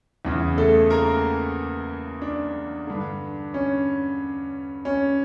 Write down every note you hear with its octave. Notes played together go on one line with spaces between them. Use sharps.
E2 C#3 E3
A3 A4
A#3 A#4
D4
G2 D3
C#4
C#4